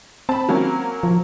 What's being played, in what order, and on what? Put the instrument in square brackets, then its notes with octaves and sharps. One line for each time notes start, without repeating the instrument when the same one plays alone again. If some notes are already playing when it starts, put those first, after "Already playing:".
[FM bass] C4 [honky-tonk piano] A5 B5
[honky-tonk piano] F#3 A#3 C#4
[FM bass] F3